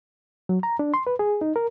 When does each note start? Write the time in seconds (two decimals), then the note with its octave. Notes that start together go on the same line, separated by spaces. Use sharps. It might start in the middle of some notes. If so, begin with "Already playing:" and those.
0.49 F#3
0.63 A#5
0.79 D4
0.94 C6
1.07 B4
1.19 G#4
1.41 D#4
1.56 A#4